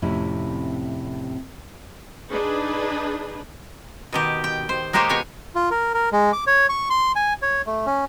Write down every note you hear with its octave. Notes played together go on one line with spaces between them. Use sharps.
F2 A2 C3 C#4 E4
D4 D#4 G#4 B4
B2 D#3 G4
G5
C5
G#3 A#3 D#4 G4 C5 C#5
B2 G#3 C#5 G#5
F4
A#4
A#4
G#3
D6
C#5
C#6
C6
G#5
C#5
A3
C#4